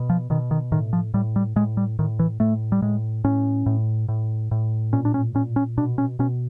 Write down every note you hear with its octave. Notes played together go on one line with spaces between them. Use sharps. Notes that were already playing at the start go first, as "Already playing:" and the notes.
Already playing: B2
F3
B2 D#3
D#3
A2 D#3
F3
A2 G3
G3
A2 G#3
G3
A2 D#3
E3
A2 A3
G3
A2 G#3
A2 C#4
A2
A2
A2
A#2 C#4
D4
C#4
A#2 C#4
C#4
B2 D4
C#4
B2 C#4